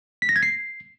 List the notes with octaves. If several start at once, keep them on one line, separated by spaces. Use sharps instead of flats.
B6
A#6
G#6
C7